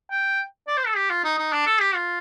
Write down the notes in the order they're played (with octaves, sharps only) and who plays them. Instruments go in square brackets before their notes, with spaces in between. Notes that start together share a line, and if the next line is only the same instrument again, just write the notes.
[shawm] G5
D5
C5
A4
G4
F4
D#4
D#4
D4
A4
G4
F4